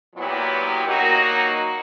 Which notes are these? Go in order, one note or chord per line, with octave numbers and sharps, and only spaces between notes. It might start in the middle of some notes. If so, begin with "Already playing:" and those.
A#2 F#3 B3 E4 G4
F#3 A#3 D#4 F#4